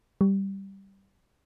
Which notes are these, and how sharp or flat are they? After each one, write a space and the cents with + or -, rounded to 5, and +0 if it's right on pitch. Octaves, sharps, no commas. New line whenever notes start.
G3 -5